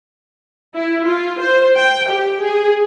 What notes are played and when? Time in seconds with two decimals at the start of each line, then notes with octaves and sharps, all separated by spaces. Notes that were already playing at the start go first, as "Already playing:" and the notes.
0.74 E4
1.06 F4
1.41 C5
1.76 G5
2.10 G4
2.41 G#4